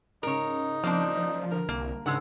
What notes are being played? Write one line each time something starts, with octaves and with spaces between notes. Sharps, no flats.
G#2 C#3 D#4 A#4 C#5
F3 A#3 C4 D4
D3 A#4
C2 A#3
G#1 C#3 G#3 D4 F#5 E6